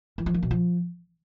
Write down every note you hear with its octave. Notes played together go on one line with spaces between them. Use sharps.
E3
F3
A#3
B2
F3